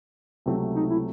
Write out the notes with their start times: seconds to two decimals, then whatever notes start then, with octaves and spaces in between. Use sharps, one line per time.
0.46 C#2 C3 F#3 A3 C4
0.75 D#4
0.90 E4